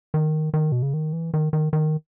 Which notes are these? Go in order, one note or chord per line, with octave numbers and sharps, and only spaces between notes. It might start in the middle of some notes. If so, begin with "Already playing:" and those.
D#3
D#3
B2
C#3
D#3
E3
D#3
D#3
D#3